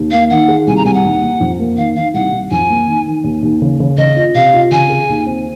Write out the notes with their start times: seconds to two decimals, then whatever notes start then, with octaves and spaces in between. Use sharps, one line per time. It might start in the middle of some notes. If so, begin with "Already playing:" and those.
Already playing: D#2
0.11 A#3 F5
0.30 D#3 F#5
0.48 G#4
0.67 C2 G#5
0.77 A#5
0.85 C2 G#5
0.94 F#5
1.04 D#2
1.22 A#3
1.40 F2
1.60 A#3
1.77 D#3 F5
1.95 D#3 F5
2.14 C2 F#5
2.33 C2
2.51 F2 G#5
2.70 A#3
2.87 D#3
3.06 D#3
3.24 D#2
3.42 D#2
3.62 C#3
3.80 C#3
3.97 C#3 D#5
4.16 F4
4.35 C3 F5
4.54 F4
4.71 C#3 G#5
4.90 G#4
5.09 D#2
5.26 C4